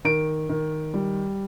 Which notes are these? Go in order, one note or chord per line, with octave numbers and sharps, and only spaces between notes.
D#3 D7
D#3
G3